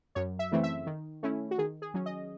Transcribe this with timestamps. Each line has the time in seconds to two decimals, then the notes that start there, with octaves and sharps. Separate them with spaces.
0.15 F#2 C#5
0.39 E5
0.52 C#3 E3 A3 C4
0.63 E5
0.86 D#3
1.23 A3 C#4 E4
1.51 F#4
1.58 D#3 G#4
1.82 G#4
1.94 F#3 C#4
2.06 D#5